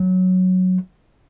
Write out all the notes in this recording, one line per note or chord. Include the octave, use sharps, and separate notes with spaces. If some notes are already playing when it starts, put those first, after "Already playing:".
Already playing: F#3